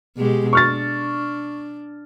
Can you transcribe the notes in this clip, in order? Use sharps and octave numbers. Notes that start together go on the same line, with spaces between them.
B2 G#3 G4
D4 C#6 F6 A6